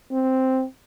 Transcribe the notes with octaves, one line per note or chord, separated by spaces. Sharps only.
C4